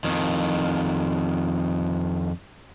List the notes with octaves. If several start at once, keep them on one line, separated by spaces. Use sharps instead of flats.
F2 D#3